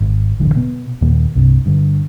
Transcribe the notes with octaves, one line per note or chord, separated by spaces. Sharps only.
G#1
E1 A1 D3 F#3
B2 B3
D#2 A#2 D#3 A#3
C2 G2 C3
G2 D3